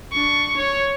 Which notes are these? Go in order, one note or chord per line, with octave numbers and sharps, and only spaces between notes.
D4 C#6
C#5